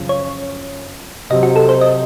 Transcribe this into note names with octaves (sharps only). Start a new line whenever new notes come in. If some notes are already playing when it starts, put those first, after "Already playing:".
Already playing: F#2 C#3 F3
C#5
C3 F#3 C4 D#5
F#4
A4
C5
D#5